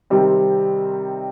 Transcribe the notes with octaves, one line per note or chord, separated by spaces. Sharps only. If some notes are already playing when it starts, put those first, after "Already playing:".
C3 D#3 G3 C4